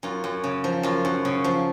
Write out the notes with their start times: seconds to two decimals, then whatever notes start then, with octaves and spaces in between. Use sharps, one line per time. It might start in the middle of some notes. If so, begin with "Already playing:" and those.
0.03 F#2 F4
0.24 F#2
0.44 C#3
0.64 F3
0.83 F#2 F4
1.05 F#2
1.25 C#3
1.44 F3